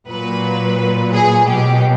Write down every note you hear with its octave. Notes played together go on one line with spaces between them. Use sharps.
A#2 F#3 B4
G#4
B2 F#3 G4